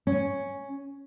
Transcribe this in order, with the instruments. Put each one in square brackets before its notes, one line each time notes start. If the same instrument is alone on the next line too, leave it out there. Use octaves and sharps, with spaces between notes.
[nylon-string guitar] C#4